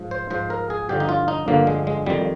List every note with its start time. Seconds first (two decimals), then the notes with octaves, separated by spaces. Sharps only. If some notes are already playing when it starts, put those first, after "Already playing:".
Already playing: G#2 F3
0.11 C5
0.30 G#2 F3 C5
0.50 A#4
0.70 G#4
0.89 G2 D3 F3 G4
1.00 D#4
1.09 F4
1.28 D#4
1.48 G2 D3 F3 A#3
1.67 G#3
1.87 G#3
2.06 F2 D#3 G3